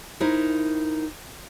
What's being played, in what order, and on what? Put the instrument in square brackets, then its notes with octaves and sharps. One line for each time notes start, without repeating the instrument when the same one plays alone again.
[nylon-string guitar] D#4 E4 A#4 C5